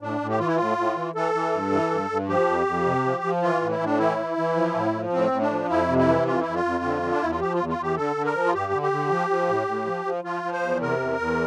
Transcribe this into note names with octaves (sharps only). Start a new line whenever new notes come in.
A2 D4
A2
G4
E3 F4
E4
A2 F4
A2
E3
E3 A4
E3
G2
E3
G2
G2
F3 G4
F2
F2
C3
F3
F3
E3 F4
A2
E4
A2 D4
E3 E4
E3
E3
F3
A2
F3
A2 C4
A2
D4
F3
F2 E4
C3
E4
E3
F2 F4
F2 E4
F4
F2
D3
D3
D4
E2 E4
F4
F3 G4
F4
E2
F4
E2 G4
D3 A4
D3
A#4
F3
F4
G2 G4
D3
G4
D3
F3
F3
A2
A2
F3
F3
F3 F4
F3
C5
E2
C3 A#4
E2
E2